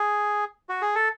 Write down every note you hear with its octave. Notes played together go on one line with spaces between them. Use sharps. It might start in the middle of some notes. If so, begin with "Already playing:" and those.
Already playing: G#4
F#4
G#4
A4